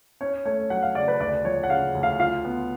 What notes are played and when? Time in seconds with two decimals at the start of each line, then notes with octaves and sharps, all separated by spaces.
0.21 C#4 C#5
0.45 A3 C#5
0.70 F#3 F#5
0.83 F5
0.95 C#3 D5
1.08 B4
1.20 D2 D5
1.45 F3 C#5
1.63 F#5
1.70 C#3 F5
1.95 D2
2.03 F5
2.19 F4 F5
2.45 B3